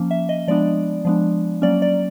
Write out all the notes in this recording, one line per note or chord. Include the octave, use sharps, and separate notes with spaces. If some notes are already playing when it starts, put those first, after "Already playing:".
Already playing: F3 A#3 C#4
E5
D#5
F3 G#3 B3 D4 D5
F3 G#3 B3 D4
F#3 A#3 C#4 D5
D5